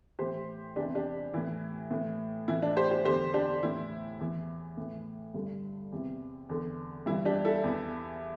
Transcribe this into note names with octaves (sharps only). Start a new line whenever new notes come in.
A2 E3 G4 C5
E2 C3 E3 D4 G4
D4 G4
A2 E3 E4
A2 E3
A2 E3 E4
D4
G4 C5
G4 C5
E2 D3 G4 C5
D4 G4
A2 E3 E4
E2 E3
A2 E3
G2 D3
E2 C3 E3
E2 D3
G2 E3 E4
D4 G4
E4 A4
E2 E3